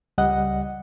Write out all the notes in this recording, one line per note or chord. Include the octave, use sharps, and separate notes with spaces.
C#2 G3 D#5 F#5